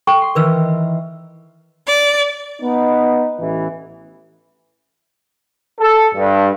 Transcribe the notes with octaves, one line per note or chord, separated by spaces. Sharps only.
A4 G5 C#6
C6
D#3 E3 A#4 B4 E6
D5
B3 D#4
A1 E3
A4
G2